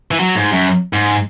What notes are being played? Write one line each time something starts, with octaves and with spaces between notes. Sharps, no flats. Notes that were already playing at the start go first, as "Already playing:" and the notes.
E3
F#3
G#2
F#2
G#2